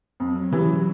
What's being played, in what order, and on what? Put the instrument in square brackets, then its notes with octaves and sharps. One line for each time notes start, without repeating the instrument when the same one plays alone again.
[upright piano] F2 [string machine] F#3
[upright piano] C#3 E3 G3